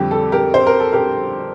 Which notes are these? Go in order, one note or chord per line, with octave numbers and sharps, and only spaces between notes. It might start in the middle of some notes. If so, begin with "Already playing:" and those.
Already playing: F2 D3 G3 C4 G4
A4
G4 A#4
C5
A#4
A4
G4 A#4